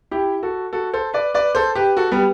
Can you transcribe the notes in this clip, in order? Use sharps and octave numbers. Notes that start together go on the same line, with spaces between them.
E4 G4
F#4 A4
F#4 A4
A4 C5
B4 D5
B4 D5
A4 C5
G4 B4
F#4 A4
G3 B3